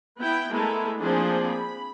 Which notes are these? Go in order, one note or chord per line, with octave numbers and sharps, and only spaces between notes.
B3 E4 G5
G#3 A3 B3 E4 A4 A#4
F3 A#3 C4 D4 G#4 C5
B5